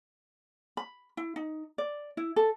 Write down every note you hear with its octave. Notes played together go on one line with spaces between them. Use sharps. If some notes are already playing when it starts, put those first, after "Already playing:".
B5
E4
D#4
D5
E4
A4